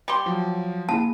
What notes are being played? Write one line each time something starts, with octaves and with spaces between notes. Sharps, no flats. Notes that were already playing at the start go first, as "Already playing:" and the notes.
G3 G4 C6
F3 F#3
A#3 E4 G#4 A5